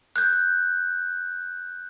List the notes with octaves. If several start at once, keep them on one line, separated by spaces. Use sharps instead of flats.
F#6 G6